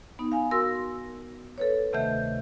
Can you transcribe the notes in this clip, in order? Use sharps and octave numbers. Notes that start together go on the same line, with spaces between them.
B3 D#4
F5 G#5
F#4 A#4 C6 E6 A#6
A4 B4 C#5
D2 C3 D#3 A3 E5 G6